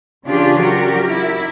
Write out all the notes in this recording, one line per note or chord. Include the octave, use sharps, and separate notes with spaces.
C#3 E3 D4 F4 G4 G#4
F#3 F#4 G4 A#4
E4